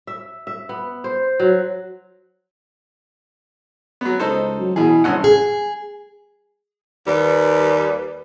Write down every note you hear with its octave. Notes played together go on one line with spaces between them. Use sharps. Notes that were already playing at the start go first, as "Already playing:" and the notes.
E5
E5
B3
C5
F#3
F#3 B3
C#2 D#4 A4 C5
F#3
B2 E3 G#4
G#1 G2 C#4 F#5
G#4
D#2 G3 B4